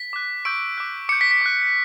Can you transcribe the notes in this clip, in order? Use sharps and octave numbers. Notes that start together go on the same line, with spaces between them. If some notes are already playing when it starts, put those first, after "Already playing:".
Already playing: B6
D6 F#6
C#6 E6 G6 D7
D6 F#6
D6 G6 C#7
B6
B6
D6 F#6